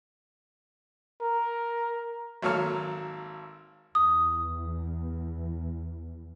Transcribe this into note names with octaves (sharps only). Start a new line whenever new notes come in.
A#4
G#1 F#3 A#3 A4 C#5 F6
E2 D#6